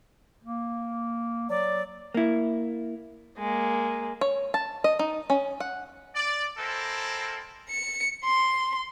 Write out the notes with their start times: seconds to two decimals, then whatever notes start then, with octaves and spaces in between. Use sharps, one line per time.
0.44 A#3
1.49 F#3 D5
2.14 A#3 E4
3.38 G#3 A#3
4.21 C#5
4.54 A5
4.84 D#5
4.99 D#4
5.30 C#4
5.60 F#5
6.15 D5
6.58 G#3 C4 E4 A4 A#4 C5
7.69 C#7
8.24 C6